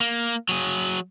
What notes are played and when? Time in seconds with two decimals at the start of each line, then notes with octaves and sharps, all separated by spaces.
0.01 A#3
0.49 F#3 G#4